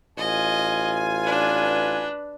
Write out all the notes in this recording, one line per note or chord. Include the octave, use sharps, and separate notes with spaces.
A1 F4 D#5 G#5
D4 B4